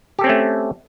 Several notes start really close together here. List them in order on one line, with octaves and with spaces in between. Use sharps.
G4 A4 C4 C#4 A3